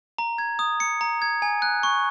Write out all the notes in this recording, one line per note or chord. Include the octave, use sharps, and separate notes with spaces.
A#5
G#6
D#6
C#7
A#5
G#6
G#5
F#6
C#6